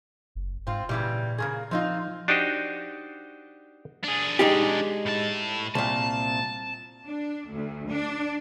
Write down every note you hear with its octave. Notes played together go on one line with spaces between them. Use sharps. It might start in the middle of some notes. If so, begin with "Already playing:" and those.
F#1
G#2 C4 F4
A#2 C#3 E3 G3
C#3 A#3 G#4
F3 C4 D#4 F4
D4 D#4 F#4 G4 C5 D#5
D4 G#4
G#3 D#4 G4
A2 A5
C2 A#2 A5
D4
D2
D4